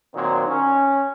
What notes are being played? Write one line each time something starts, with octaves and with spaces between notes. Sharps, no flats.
A#2 D#3 F#3 C4
C#4